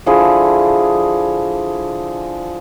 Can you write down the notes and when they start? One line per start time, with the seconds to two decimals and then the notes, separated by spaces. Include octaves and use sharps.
0.06 D3 F3 E4 G#4